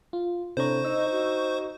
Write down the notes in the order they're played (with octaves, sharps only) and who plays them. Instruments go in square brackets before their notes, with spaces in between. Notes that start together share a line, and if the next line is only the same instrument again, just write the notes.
[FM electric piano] F4
[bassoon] A2 [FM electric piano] C3 D4 A#5 [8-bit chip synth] C5 C#6
[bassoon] D#4 [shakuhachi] D#5 [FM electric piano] E6
[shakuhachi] F#4